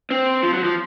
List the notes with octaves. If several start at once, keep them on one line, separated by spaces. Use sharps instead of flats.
C4
F3
F#3
F3